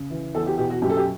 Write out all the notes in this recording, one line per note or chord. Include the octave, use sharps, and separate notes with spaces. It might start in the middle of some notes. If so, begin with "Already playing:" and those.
Already playing: C#3
E3
E2 A4
G4
B2 G4
F#4
F#2 G4
A4
G4